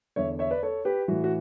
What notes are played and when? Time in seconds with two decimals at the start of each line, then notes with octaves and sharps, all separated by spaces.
0.16 E2 D3 C#5 E5
0.39 C#5 E5
0.51 B4 D5
0.63 A4 C#5
0.85 G4 B4
1.08 A2 E3 F#4
1.24 F#4